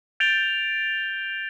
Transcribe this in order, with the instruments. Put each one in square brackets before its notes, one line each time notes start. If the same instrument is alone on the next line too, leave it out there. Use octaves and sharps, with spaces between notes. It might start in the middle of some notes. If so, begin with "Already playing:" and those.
[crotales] G6 A6 D7 F7 G7